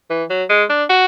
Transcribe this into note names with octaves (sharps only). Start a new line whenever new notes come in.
E3
F#3
G#3
D4
F#4